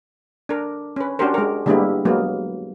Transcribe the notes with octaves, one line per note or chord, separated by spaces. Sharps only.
D4 A#4
C#4 B4
C#4 D4 F#4 G4 A#4 C5
G#3 A#4
D3 G3 G#3 A#3 B3 E4
F#3 G#3 A#3 B3